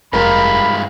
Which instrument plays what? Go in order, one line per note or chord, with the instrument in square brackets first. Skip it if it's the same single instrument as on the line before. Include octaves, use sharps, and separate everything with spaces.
[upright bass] F1 [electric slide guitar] G2 G#3 F4 [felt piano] A#4 [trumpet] B5